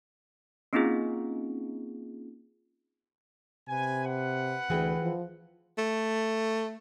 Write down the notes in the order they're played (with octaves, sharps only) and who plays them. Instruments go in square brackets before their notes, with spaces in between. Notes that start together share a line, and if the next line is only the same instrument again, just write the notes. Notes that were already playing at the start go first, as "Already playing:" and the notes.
[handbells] A#3 C4 C#4 D#4 F4 G#4
[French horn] C3 [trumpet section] B4 G#5
[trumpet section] B4 F#5
[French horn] D2 [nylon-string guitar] E3 G#4 G5
[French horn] F3
[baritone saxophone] A3